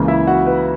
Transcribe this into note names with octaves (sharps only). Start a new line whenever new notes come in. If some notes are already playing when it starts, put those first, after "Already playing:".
Already playing: C#2 C#3 E3 A#3
E4 E5
F#4 F#5
B4